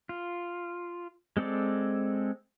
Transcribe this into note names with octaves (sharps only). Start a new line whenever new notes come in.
F4
G#3 C4 A4 D5